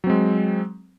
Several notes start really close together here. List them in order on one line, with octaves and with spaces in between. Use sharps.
F#3 C4 G#3